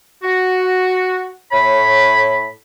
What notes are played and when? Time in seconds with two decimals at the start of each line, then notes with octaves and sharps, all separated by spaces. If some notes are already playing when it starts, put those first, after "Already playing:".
0.24 F#4
1.52 A2 C#5 B5